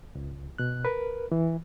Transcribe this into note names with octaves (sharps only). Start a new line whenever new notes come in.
C#2
B2 F#6
A#4 B4
E3